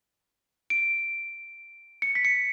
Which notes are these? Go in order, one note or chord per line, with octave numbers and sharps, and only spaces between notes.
D7
C#7
B6
C#7